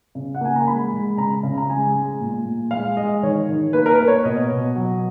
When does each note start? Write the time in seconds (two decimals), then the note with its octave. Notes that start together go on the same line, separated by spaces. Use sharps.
0.15 C#3
0.35 F#5
0.41 A#3 G#5
0.56 A#5
0.67 G#3 B5
0.93 G#3
1.17 C#3 A#5
1.43 C#3
1.58 A#5
1.70 G#3 G#5
1.95 G#3
2.20 A#2
2.45 A#2
2.71 G#3 F5
2.97 G#3 D#5
3.23 D#3 C#5
3.49 D#3
3.73 A#3 B4
3.86 A#4
3.91 B4
4.00 A#3
4.08 C#5
4.25 B2 D#5
4.51 B2
4.76 F#3